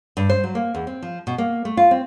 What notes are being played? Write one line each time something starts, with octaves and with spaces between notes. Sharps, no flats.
G2
C5
F#3
A#3
E2
C4
F3
B2
A#3
A3
F4
C4